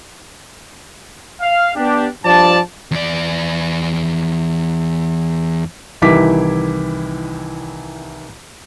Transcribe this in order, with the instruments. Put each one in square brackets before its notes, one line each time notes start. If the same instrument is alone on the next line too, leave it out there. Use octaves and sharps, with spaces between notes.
[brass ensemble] F5
B3 D4 G4
G2 F3 D5 A5
[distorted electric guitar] E2 D5
[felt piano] C2 D#3 E3 E4 D6 B6